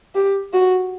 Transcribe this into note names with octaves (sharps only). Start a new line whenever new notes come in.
G4
F#4